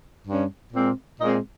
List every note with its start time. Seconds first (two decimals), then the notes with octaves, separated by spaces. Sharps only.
0.26 G2 G3 C#4
0.73 A#2 G#3 C4
1.20 A#2 D#5
1.22 G#3 C4